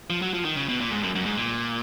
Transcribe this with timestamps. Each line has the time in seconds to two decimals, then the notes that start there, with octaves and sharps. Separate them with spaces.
0.10 F3
0.22 F#3
0.34 F3
0.45 D#3
0.56 C#3
0.69 B2
0.80 A#2
0.91 G#2
1.03 F#2
1.15 F#2
1.26 G#2
1.37 A#2